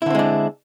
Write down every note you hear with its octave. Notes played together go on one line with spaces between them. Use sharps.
D3 G#3 C4 D4 E4